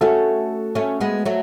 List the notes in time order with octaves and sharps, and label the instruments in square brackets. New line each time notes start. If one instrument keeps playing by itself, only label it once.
[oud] A3 C#4 [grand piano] F#4 A4
[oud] A3 C#4
G#3 B3
F#3 A3